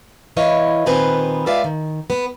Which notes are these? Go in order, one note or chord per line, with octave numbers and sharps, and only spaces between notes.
E3 E4 B4 C#5 D#5 F5
A#2 D#3 B3 C4 B4 G#5
G#3 F4 B4 D5 E5 F5
D#3
B3